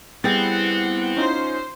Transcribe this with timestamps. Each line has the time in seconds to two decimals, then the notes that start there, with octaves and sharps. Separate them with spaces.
0.24 G3 B3 C4 E4 G#4 F#5 G5 A6
1.17 C#4 D#4 F4 C5